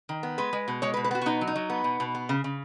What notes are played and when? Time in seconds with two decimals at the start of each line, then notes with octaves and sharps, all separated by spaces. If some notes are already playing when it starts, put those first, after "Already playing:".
0.09 D#3
0.23 B3
0.38 G#3 B4
0.53 G#3
0.68 B2
0.82 G#3 C#5
0.94 B4
0.97 B2
1.04 B4
1.11 B3 F#4
1.22 F#4
1.26 B2 D#4
1.41 F#3
1.48 D#4
1.56 F#3
1.70 B3
1.84 B2
2.00 B2
2.15 B3
2.29 C#3
2.44 C#3